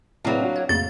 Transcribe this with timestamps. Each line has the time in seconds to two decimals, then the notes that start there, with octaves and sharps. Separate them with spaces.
0.25 A2 F#3 A3 A#3 C4 E4 G#4 B4
0.40 D4 F#4
0.56 C#5
0.69 F2 A2 C#3 A#3 A6